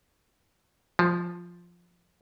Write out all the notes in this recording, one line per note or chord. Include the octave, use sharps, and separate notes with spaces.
F3